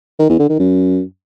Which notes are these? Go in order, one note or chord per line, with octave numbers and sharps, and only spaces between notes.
D#3
E2
D3
D#3
F#2